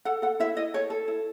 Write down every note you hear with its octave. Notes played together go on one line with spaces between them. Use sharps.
A4 F#5
A4 F#5
E4 E5
E4 D#5
A4 C#5
A4
E4